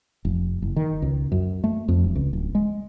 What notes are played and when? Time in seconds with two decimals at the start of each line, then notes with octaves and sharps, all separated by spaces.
0.25 F1
0.62 F#1
0.76 D#3
1.02 C#2
1.32 F#2
1.64 A3
1.88 F2
2.04 E1
2.15 C#2
2.33 D1
2.55 G#3